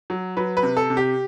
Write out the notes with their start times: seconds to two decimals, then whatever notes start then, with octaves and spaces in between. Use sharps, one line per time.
0.10 F#3
0.37 F#3 B4
0.57 B4
0.63 C3
0.77 A4
0.90 C3
0.97 G4